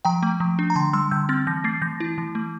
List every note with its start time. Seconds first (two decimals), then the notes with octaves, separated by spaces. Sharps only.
0.05 F3 G5 A#5
0.23 A3
0.40 F3
0.59 D4
0.70 A#5
0.76 D3 A5 C6
0.93 G3 C6 E6
1.11 D3 E6 G6
1.29 C4 F6 A6
1.47 E3 G6 A#6
1.64 A3 A6 C7
1.82 E3 G6 A#6
2.00 E4
2.18 E3
2.35 A3